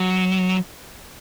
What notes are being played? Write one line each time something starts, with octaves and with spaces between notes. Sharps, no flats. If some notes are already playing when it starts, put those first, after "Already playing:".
Already playing: F#3